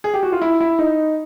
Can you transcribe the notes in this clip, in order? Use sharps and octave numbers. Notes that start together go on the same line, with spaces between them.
G#4
G4
F#4
F4
E4
E4
D#4